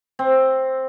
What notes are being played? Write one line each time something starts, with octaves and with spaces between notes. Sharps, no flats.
C4